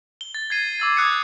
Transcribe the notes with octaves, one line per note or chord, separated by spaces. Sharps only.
G7
A6
G#6 A6 C7 D#7
D6 E6 A6
D6 D#6 F#6 G#6 C7 C#7